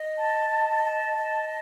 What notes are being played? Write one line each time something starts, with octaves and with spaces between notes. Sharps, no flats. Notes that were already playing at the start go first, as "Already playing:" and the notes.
Already playing: D#5
A5
D#5
A5
D#5